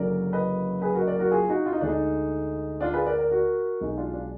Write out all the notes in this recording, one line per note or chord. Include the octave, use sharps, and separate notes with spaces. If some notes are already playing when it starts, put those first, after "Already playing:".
Already playing: F#1 F#2 D3 F#3 A#4 D5
B4 D#5
G#4 B4
F#4 A#4
D#5
A#4 D5
F#4 A#4
F4 G#4
D#4 F#4
F4
D#4
D2 D3 G#3 D4
D#4
D4 F4
G#4 B4
A#4 D5
A#4 D5
F#4 A#4
B1 B2 G#3 D#4
D4 F4
D4